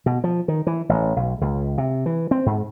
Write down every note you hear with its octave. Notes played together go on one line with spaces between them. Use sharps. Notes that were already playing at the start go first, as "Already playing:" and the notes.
B2
F3
D#3
E3
A1
B1
C#2
C3
E3
C4
G#2